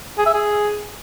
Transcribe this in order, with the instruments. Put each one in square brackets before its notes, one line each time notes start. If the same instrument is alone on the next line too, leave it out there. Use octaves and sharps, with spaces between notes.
[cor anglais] G#4
E5
G#4